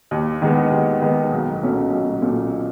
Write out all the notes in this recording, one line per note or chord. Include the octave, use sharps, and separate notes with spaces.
D#2
D#3 G#3 B3
D#2
D#3 G#3 B3
B1
A#2 F#3 A3 C#4
B1
A#2 F#3 A3 C#4